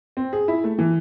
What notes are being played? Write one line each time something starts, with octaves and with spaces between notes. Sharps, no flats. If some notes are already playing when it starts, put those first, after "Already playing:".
C4
G#4
E4
A3
E3